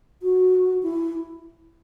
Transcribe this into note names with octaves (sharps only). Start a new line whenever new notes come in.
F#4
E4